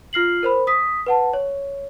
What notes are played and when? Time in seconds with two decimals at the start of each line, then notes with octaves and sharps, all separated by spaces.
0.13 F4 F6 C7 F#7
0.43 A#4 C5 B5
0.67 D#6 B6
1.06 B4 F#5 A5
1.33 C#5